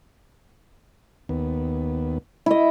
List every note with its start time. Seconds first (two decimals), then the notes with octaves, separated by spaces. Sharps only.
1.29 D#2 B3
2.46 E4 D#5